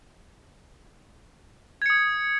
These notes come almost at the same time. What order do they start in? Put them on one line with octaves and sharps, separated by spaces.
G#6 C#7 D#6